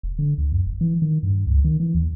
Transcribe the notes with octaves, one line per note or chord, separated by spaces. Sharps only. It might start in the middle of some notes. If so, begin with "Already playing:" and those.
F1
D3
D2
F#2
F#1
E3
D#3
G2
C#2
D#3
E3
D#2